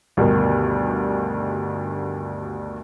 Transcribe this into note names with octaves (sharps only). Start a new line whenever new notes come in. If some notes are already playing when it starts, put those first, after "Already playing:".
D2 G2 B2 D#3